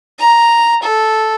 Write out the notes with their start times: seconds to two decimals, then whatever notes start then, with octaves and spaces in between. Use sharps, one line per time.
0.19 A#5
0.82 A4